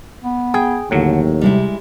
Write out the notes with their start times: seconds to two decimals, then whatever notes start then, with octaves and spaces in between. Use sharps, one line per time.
0.24 B3
0.54 G#4 G5
0.91 D#2 A2 D3 F#3
1.41 C3 G3 G#3 E4